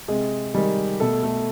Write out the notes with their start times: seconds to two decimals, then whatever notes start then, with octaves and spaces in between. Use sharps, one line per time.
0.08 C3 G#3 G#4
0.54 D#3 G3 G#3 G4
1.00 B2 A3 A4
1.23 A3 A4